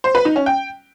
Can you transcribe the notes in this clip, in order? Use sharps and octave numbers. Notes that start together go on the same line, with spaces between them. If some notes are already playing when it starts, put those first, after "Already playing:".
C5
B4
D#4
C#4
G5